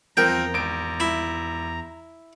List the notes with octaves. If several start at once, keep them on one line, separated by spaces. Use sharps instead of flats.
E2 F3 C4 A#4 G5 A#5
G#1 D7
E4